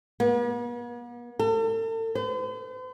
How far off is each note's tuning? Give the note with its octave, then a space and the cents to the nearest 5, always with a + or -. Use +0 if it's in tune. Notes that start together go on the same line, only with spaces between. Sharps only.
B3 -45
A4 +40
C5 -45